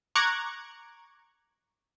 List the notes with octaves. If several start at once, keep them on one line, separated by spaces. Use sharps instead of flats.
A#5 C#6 D6 F#6 G#6